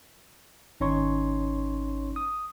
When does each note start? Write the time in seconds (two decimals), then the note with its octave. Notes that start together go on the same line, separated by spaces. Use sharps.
0.80 G#1 C#4 D#4 C#5 C6 C#6
2.16 D#6